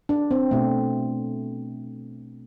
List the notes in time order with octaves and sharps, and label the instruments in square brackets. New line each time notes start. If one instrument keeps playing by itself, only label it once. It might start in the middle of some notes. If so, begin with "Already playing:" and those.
[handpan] D4
C4
B2 A3